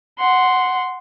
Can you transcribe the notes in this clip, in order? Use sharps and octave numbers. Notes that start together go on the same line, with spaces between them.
F#5 C6